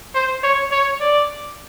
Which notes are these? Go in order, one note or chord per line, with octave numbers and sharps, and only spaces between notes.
C5
C#5
C#5
D5